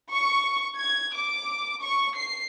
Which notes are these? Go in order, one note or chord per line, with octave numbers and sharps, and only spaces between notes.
C#6
G#6
D6
C#6
C7